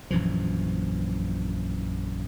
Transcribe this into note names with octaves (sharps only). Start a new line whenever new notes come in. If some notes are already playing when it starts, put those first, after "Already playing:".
A#1 F#2 E3 F3